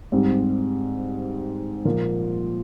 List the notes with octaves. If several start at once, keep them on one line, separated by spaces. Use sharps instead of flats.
G#2 G3 C4
A#2 F3 A#3 F4 A#4